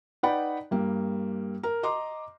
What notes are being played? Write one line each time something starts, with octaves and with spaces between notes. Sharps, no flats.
D#4 B4 D5 F#5 G5 B5
G2 G3 A#3
A#4
D#5 A#5 C6 D6